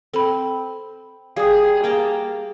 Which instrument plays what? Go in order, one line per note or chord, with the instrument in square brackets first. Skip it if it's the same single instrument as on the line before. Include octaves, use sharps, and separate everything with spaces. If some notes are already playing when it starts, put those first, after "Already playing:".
[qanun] C4 [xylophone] A4 B5
[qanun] G3 [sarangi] G#4 [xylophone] F5 D#6
[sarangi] A#3 [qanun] G5 A5 A#5